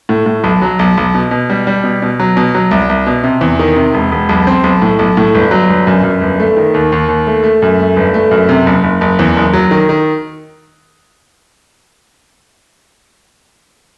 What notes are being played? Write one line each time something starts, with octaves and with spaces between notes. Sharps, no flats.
A2
A2
B1
F#3
B1
B1
B2
B2
G3
G3
B2
B2
F#3
B2
F#3
C2
C2
B2
C3
E2
D#3
C3
E1
E1
B1
C4
B1
A2
B1
A2
G1
F#3
G1
F#2
F#2
G1
A3
D#3
D#2
D#2
D#2
A3
A3
F#2
A3
G1
A3
F#2
C3
F#1
F#1
F#1
E2
F#1
F#3
D#3
D#3